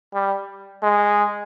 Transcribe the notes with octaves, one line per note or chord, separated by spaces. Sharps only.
G3
G#3